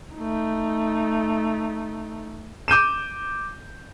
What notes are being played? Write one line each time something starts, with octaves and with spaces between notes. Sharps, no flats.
A3 D#4
D6 G6 D#7 E7